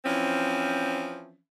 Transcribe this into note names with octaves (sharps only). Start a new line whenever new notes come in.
E3 F3 C4 C#4